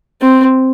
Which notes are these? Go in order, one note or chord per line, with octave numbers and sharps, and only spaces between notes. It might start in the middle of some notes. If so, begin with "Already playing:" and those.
C4